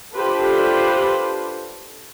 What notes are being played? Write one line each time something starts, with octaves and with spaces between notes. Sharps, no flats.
D4 F4 G4 A4 B4 C5